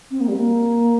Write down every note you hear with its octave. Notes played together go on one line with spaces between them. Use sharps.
C4
A#3
G3
A#3